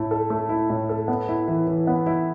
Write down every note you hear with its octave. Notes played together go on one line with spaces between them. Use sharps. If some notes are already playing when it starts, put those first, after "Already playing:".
Already playing: A2 A3 E4
A4
A3
E4
A2
A4
B3
E4
E3
E3
B3
E4